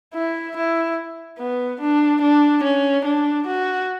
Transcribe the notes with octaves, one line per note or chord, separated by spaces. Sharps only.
E4
E4
B3
D4
D4
C#4
D4
F#4